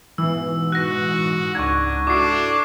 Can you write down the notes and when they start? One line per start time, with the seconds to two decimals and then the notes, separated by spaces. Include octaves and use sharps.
0.18 G#2 B2 E3 E6
0.72 F#4 F#6 A#6
1.55 C#2 D4 F#5 A#5 C#6 G#6
2.07 D4 E4 F#4 A4 D6 C7